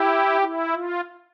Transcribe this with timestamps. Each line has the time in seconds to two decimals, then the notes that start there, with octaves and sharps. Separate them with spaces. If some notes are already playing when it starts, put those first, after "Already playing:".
Already playing: E4 G4
0.41 E4
0.73 F4